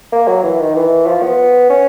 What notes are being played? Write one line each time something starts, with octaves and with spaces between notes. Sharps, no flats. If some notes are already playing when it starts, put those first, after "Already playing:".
A#3
F#3
E3
D#3
E3
F3
B3
C#4